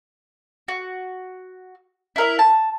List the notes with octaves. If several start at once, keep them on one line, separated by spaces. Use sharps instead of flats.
F#4
E4 A#4 E5
A5